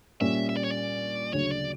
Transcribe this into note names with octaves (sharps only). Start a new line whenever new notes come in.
A#2 G3 C#4 E5
E5
D5
C#5
D5
D2 C#3 F#3 C#5
D5